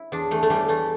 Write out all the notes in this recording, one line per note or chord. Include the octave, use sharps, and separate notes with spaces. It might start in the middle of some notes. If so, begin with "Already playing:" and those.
Already playing: E4
E2 D4
E3 A3
A3
E3 G3
E3 A3